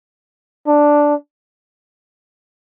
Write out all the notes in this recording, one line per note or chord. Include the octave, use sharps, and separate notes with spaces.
D4